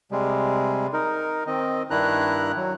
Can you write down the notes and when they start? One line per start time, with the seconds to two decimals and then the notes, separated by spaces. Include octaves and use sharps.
0.12 C3 G3 G#3
0.93 D#4 A#4
1.47 D#3 C4 D#5
1.90 G2 D#3 D4 E4 A#5 F#6
2.56 F#3